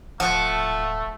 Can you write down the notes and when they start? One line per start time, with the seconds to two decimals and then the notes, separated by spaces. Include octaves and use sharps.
0.20 D1 F3 A3 F#5